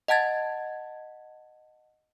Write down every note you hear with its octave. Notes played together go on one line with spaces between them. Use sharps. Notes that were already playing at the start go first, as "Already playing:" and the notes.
D#5 F#5 A5 G#6 A6